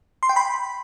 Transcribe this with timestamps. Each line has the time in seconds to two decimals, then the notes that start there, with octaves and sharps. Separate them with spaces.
0.23 C6
0.29 G5
0.36 B5